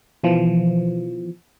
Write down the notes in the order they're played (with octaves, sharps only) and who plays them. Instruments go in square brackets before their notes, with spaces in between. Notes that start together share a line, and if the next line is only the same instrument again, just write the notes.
[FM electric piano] B2 E3 F3